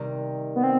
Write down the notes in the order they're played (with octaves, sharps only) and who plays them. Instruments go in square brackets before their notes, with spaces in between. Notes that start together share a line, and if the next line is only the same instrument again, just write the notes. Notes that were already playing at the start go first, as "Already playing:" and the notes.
Already playing: [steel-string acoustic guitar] C3 D#3 G3
[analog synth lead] B3
C4